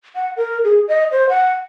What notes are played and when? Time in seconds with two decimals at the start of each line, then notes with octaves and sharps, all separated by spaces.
0.16 F#5
0.37 A#4
0.64 G#4
0.88 D#5
1.12 C5
1.29 F#5